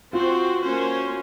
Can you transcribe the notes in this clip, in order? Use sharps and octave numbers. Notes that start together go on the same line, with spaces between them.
C4 F4 F#4 C5
A#3 C#4 F#4 C5